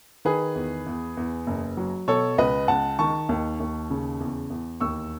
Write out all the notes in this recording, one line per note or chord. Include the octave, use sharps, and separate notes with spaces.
D#3 G#4 B4
E2
E2
E2
F#1
F#3
B2 A4 C#5
C#2 B4 D#5
C#2 F#5 A5
D#3 A5 C#6
D#2
D#2
C#3
E2
E2
D#2 C#6 E6